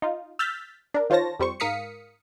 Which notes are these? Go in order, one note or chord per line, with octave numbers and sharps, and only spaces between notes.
D#4 F4
E6 F6 G6 A6 B6
D4 A#4
D#3 F4 C5 C#5 A5 A#6
F2 G3 C5 C#6
G#2 A#4 F5 D#6 B6 C#7